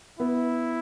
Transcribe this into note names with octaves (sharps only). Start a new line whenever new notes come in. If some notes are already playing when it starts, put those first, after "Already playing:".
B3 E4